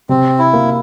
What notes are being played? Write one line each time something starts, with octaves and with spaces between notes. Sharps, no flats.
C3 C4
E4
A#3